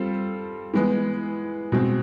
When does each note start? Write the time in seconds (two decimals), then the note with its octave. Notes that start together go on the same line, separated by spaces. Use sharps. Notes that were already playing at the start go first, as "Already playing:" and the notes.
Already playing: G3 C4 F4 A4 C5
0.74 E3 G#3 B3
1.72 B2 G#3 C4